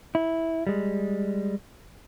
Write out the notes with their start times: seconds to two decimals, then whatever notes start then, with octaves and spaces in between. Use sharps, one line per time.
0.15 E4
0.67 G3 G#3